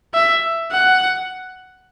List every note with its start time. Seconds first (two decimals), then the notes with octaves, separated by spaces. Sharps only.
0.14 E5
0.72 F#5